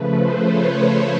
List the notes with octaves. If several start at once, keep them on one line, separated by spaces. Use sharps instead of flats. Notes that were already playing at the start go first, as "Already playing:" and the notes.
Already playing: C#3 F3 A3 B4
C5
C#5